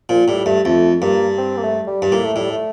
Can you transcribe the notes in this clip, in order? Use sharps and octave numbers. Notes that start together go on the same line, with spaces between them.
A#2 F3
A2 G3
G2 A3
F2 A3
G2 A#3
C4
A#3
A3
G3
G2
A2 A#3
A3
A2 G3
A3